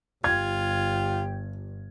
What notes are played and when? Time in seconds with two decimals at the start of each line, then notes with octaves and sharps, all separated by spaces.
0.24 G1 F4 G4 G#6